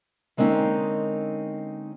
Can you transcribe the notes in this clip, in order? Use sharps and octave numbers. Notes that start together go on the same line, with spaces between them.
D3 G#3 A#3 C4 C#4 D#4